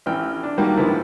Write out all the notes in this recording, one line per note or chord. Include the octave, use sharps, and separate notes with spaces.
A1 E3 G5 F6
D4
D#3 F#3 G3 A#3 F#4 G4
G#2 D3 F3 B3 E4